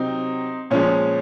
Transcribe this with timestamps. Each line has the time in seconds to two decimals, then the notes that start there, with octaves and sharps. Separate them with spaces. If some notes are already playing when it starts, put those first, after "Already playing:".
Already playing: C3 F#3 C4 D#4
0.70 A#2 F3 G#3 C#4